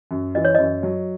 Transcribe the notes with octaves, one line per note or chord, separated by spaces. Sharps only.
F#2
E3 D#5
C#5
F#2 D#5
F#3